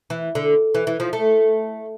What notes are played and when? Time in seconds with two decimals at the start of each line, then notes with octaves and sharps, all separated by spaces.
0.10 E3
0.35 D3
0.75 E3
0.87 E3
1.00 F3
1.13 A3